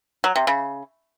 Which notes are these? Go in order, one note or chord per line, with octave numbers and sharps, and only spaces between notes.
F#3
C3
C#3